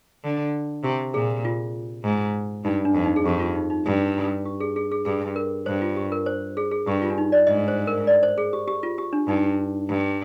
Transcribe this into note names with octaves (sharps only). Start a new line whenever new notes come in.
D3
C3 G4
A#2 G#4
F4
G#2
G2 D#4
D4
F2
D#4
G#4
F2 G4
F4
D#4
D#4
G2
G4
G#4
G#4
G#4
G2 G#4
A#4
G2 C5
F4
G4
A#4
C5
G#4
G#4
G2 G4
F4
D4
D#4
D5
G#2 D#5
C5
A#4
D5
C5
G#4
G4
G4
F4
G4
D4
G2 D#4
G2